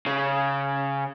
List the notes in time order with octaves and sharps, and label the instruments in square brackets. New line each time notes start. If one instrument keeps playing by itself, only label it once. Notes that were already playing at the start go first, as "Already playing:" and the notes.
[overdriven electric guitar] C#3